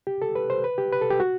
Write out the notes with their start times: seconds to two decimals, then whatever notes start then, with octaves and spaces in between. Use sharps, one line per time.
0.07 G4
0.22 A4
0.35 B4
0.50 C5
0.64 B4
0.78 G4
0.93 B4
1.01 A4
1.11 G4
1.20 F#4